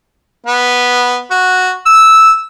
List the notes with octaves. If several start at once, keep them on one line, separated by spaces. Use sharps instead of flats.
B3
F#4
E6